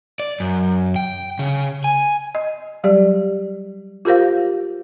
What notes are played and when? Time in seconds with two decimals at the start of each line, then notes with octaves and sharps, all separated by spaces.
0.20 D5
0.40 F#2
0.96 G5
1.39 C#3
1.84 G#5
2.35 D#5
2.84 F#3 G3 G4 D5
4.05 F4 G4 A#4 C5 F5